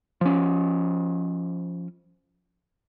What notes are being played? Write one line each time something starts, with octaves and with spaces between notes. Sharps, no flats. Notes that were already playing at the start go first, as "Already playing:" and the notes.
F3 C#4